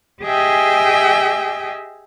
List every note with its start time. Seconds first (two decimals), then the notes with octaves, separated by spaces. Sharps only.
0.23 G4 G#4 D#5 E5 G5 G#5